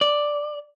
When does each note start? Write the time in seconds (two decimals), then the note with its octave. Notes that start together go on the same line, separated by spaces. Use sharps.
0.01 D5